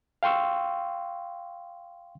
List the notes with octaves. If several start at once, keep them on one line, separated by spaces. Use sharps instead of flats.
F5 G5 C6 C#6 E6